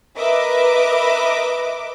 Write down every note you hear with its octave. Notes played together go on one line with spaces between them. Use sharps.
A#4 B4 D#5 E5 D6